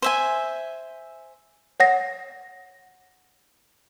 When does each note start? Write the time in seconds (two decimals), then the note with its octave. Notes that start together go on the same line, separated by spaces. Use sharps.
0.02 C5 E5 G#5
1.80 C#5 F#5 A#6